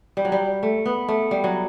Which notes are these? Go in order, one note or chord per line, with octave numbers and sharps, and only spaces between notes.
G3
F#3
G3
A3
B3
A3
G3
F#3